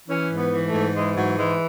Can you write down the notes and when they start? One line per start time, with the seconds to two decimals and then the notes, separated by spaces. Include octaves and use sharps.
0.09 E3 C#4
0.31 G#2
0.37 B3
0.53 E3
0.66 A3
0.73 G#2
0.95 E3 G#3
1.17 G#2 F#3
1.38 E3 G#3